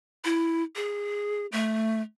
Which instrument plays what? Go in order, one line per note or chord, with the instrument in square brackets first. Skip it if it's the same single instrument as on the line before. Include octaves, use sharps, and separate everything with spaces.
[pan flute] E4
G#4
A3